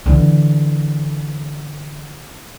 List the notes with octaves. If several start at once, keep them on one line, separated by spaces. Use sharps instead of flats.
D3 E3